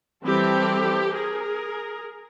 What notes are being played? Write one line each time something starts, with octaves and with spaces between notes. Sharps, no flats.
E3 G3 C4 G4 A4
G#4 A#4